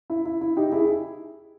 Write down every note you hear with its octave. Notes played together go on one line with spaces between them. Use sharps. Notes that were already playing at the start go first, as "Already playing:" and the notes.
E4
E4
E4
D#4 G4
E4 G#4